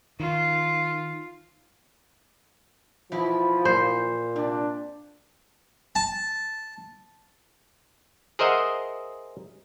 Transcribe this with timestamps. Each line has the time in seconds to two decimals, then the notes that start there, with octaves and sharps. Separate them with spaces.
0.20 D#3 F4
3.12 B2 E3 F3 E4
3.65 A#2 C5
4.36 C3 D4
5.95 A5
8.39 G#4 A#4 C5 D#5 E5 F#5